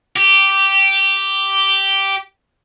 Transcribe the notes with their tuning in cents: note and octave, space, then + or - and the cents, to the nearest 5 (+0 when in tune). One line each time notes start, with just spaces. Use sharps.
G4 -5